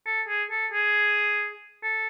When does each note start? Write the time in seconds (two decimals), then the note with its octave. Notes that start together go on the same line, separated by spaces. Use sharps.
0.06 A4
0.28 G#4
0.51 A4
0.72 G#4
1.83 A4